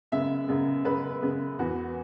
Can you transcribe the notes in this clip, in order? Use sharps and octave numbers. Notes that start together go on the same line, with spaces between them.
F#2 C#3 G#3 B3 E5
F#2 C#3 G#3 B3
F#2 C#3 G#3 B3 B4
F#2 C#3 G#3 B3
E2 E3 B3 F#4